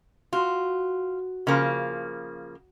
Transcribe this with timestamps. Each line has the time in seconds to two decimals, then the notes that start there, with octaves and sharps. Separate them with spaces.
0.33 F4 F#4
1.47 C#3 F3 A#3